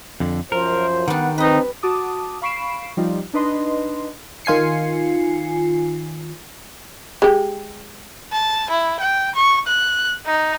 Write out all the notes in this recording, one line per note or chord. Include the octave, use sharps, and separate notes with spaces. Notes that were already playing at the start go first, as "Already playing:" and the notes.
F2 D3
F#2 F3 A#4 C5
D#3 G3 B3 D4 F#5
C4 D#4 B4 D#5
F#4 A5 D6 D#6
F5 B5 C#6 C7 D7 E7
F3 G3 D#4 F4
D4 D#4 B4 D#5 C6
D#3 F4 G#5 C7 C#7
G#3 G4
A5
E4
G5
C#6
F#6
D#4